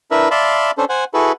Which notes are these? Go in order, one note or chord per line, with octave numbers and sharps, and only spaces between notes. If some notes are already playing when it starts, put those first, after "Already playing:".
D4 E4 A#4 B4 E5
D5 E5 F5 A5 B5 C6
C#4 D4 A4 C5
C5 F#5 G#5
E4 F#4 G#4 A4 B4